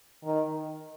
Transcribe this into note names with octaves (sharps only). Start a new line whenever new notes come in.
D#3